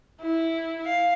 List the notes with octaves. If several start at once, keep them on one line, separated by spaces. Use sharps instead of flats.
E4
F5